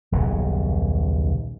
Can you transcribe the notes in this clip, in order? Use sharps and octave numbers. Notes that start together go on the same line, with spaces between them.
D#1 B1 F#2 C#3